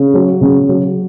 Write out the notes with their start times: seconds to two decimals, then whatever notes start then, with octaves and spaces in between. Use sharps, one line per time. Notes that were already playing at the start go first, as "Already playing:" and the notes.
Already playing: C#3
0.14 F#3
0.41 C#3
0.68 F#3